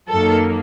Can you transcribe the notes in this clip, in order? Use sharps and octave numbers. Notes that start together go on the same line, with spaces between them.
F#2 D#3 F#3 A#3 A4